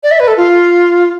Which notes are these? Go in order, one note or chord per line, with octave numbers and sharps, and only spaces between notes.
D5
E5
B4
A4
F4